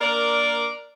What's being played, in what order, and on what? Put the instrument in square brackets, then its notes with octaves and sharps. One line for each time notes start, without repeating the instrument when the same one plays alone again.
[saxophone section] A#3 D4 A#4 D5